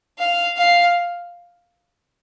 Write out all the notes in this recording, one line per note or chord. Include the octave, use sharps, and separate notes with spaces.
F5
F5